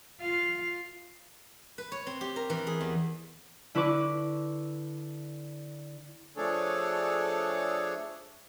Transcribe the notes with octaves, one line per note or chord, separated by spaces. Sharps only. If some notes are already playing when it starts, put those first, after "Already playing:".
F4 F5
B4
C#5
C4
G4
A#4
E3
G#4
E2
D3 E4 B4 C#6 D6
F3 A3 D4 G#4 A4 C#5